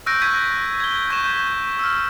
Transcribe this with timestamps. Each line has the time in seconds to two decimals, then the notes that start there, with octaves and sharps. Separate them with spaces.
0.06 C#6 E6 F#6 G6 A#6 D7
0.22 C#6 E6 G#6 B6 D#7
0.80 G#6 G7
1.10 C#6 G6 B6 E7
1.79 E6 F6